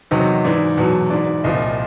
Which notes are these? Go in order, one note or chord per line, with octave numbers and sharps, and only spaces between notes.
E2 C3 D#3 F#3 D#5
G#2 E3 D5
E2 B2 F#3
G#2 E3 D5
C2 A#2 F3 D#5